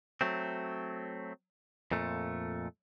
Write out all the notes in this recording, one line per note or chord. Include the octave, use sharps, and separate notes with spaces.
F#3 A3 C4
F2 A#2 A3